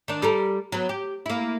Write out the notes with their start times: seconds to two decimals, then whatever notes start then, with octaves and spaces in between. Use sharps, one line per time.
0.08 D#3 D4
0.22 G3 A4 A#4
0.72 F#3 B3
0.89 G4
1.26 A#3 E4